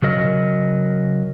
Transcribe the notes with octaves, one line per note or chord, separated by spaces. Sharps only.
C#3 F#3 A#4 D#5